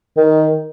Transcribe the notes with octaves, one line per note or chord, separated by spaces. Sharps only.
D#3